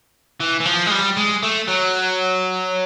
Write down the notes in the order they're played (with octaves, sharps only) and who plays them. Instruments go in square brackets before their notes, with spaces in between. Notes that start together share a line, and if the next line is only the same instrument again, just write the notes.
[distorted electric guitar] E3
E3
F3
G#3
G3
G#3
A3
F#3